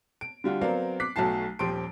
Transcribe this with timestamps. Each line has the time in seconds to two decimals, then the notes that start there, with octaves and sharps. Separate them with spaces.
0.21 D7
0.44 D3 G3 F4 F#4
0.61 F#3 B3 C4 A#4 D5 F5
1.00 D6 F#6 B6 C7
1.16 B1 F#3 A3 F#4 A5 C7
1.59 D#1 F3 G4 C6 D7